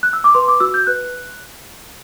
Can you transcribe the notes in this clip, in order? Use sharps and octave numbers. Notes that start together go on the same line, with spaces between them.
F#6
E6
D6
B4 C6
D6
F#4 E6
G6
B4 F#6